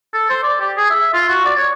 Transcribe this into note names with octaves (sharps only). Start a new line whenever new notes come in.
A4
C5
D5
G4
G#4
E5
F4
F#4
D5
C#5